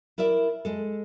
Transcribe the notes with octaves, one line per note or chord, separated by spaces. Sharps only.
E4 A#4 D5 E5
G#3 A4